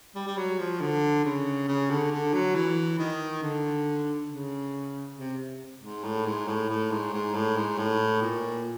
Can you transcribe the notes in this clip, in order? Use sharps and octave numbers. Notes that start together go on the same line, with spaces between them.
G3
G3
F#3
F3
D3
C#3
C#3
D3
D3
F#3
E3
D#3
D3
C#3
C3
G#2
A2
G#2
A2
A2
G#2
G#2
A2
G#2
A2
A#2